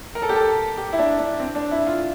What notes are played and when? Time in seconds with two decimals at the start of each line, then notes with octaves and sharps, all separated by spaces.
0.15 A#4
0.22 A4
0.29 G4
0.35 A4
0.77 G4
0.93 E4
0.98 D4
1.18 D4
1.39 C4
1.55 D4
1.71 E4
1.87 F4